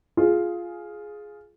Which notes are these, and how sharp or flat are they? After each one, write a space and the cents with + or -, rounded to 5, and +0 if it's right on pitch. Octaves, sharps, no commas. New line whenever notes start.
F4 +0 G#4 +10